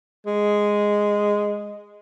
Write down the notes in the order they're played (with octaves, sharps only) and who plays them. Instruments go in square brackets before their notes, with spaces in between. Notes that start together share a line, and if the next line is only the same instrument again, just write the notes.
[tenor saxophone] G#3